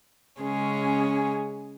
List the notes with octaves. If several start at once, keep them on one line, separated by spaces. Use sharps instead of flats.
C#3 G#3 C#4 G#4